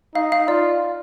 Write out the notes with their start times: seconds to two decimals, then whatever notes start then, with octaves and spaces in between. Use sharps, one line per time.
0.15 D#4 F5
0.32 F5
0.48 F4 D5